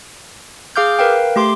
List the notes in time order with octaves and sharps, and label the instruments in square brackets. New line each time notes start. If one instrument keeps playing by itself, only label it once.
[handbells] G#4 F5 D6 F6 G6
A#4 B4 F5 G5
A3 G4 C6 D6